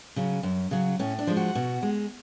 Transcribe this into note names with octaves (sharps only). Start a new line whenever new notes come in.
C#3 F#3
F#2
C#3 F#3
A2 C#4
D4
F3 G#3
F#4
B2
G#3